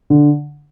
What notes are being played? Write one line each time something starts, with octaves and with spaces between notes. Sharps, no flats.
D3